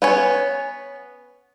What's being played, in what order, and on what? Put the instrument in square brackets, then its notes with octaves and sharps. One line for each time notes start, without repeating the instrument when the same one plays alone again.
[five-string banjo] B3 C#4 C#5